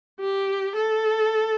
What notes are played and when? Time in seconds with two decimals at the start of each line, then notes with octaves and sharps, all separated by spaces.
0.20 G4
0.76 A4